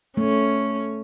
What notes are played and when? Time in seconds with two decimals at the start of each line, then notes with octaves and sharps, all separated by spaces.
0.17 A3 C#4